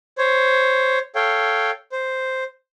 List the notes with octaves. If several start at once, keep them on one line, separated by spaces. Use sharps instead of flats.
C5 C#5
A4 C#5 F5 G5
C5